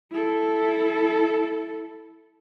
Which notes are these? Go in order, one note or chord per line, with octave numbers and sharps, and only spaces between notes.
E4 A4